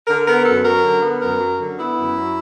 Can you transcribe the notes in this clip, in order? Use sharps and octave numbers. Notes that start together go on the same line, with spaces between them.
D3 A#4
B3 A#4
F#2 A4
F#3 A#4
D3
B3
F#2 A#4
F#3
D3
B3 E4
F#2
F#3